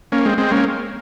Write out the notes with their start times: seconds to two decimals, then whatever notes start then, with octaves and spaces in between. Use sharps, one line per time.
0.12 A#3 C#4
0.25 G#3 C4
0.38 G#3 C4
0.51 A#3 C#4